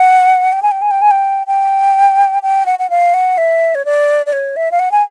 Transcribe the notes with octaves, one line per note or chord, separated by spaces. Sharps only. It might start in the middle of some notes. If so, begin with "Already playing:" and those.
Already playing: F#5
G5
G#5
G5
G#5
G5
G#5
G5
G5
G5
F#5
F#5
F5
F#5
E5
C#5
D5
D5
C#5
E5
F5
F#5
G#5